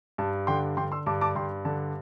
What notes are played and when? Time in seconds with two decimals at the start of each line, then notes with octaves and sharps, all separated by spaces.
0.18 G2 A5
0.47 D3 G5 C6
0.77 D3 G5 C6
0.92 C6 E6
1.06 G2 A5 D6
1.21 A5 D6
1.35 G2 G5 C6
1.65 D3 A5